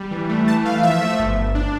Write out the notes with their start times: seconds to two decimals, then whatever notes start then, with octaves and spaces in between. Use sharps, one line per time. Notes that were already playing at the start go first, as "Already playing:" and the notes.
Already playing: G3
0.11 E3
0.29 A3
0.48 E3 A5
0.66 E3 F5
0.83 F3 E5
1.02 A3
1.19 G1
1.37 G1
1.55 D4